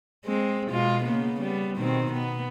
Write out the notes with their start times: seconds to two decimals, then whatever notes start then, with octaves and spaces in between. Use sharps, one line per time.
0.25 G#3 C4
0.70 B2 G#3 F4
1.04 C#3 A#3 B3
1.40 G3 B3
1.76 B2 D#3 C4
2.12 B3